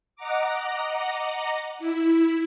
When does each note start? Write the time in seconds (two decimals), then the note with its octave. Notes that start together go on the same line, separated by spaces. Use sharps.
0.16 D#5 F#5 A#5 D6
1.79 E4